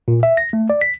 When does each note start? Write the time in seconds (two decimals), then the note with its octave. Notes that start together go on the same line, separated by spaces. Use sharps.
0.08 A#2
0.23 E5
0.37 A#6
0.53 A3
0.70 D5
0.81 B6